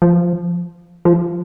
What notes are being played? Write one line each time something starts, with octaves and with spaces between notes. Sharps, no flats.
F3
F3